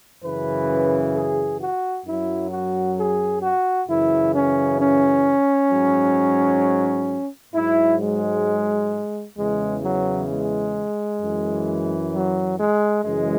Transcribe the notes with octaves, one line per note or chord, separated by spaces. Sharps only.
F#2 C#3 E3 B4
G#4
F#4
F#2 F#3 E4
F#4
G#4
F#4
F#2 C#3 E3 E4
C#4
C#4
G#2 F#3
G#2 F#3 E4
G#3
E2 C#3 E3 G#3
F#3
G#3
F#2 E3
F#3
G#3
F#2 C#3 E3 G#3